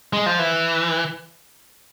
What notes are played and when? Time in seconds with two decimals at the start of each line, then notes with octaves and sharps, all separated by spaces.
0.13 G#3
0.26 F3
0.39 E3